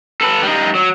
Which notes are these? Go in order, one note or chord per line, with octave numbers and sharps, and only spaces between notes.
A4 B4
G3 D#4
F#3